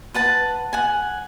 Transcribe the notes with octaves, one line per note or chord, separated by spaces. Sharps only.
B4 F#5 A5
F#5 G#5